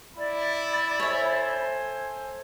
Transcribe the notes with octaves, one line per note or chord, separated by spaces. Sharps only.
E4 D5 B5
A4 C5 C#5 E5 G#5